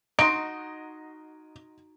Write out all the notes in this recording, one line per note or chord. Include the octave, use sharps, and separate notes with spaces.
D#4 F#4 D#5 A#5 C6 D7